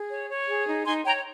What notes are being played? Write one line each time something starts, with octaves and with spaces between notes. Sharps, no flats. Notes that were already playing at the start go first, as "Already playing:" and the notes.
Already playing: G#4
C#5
C#5
G#4
D#4
D#4 G#5 C6
C#5 G5 A#5